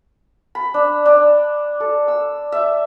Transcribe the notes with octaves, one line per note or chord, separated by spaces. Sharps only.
B5
D4
D4
A4
E6
E5